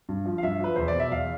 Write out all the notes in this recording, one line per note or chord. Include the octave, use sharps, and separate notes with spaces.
G2
F3
F5
G2 E5
F3 B4
E2 C5
D5
B2
E5
E2 F5